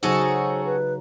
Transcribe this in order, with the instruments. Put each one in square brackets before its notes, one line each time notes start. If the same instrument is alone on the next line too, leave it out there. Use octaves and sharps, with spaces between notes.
[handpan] C#3 F#3 D#4 [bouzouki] F#4 G#4 A4 [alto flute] C5
[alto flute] B4